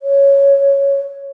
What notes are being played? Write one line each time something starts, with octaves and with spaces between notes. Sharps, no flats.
C#5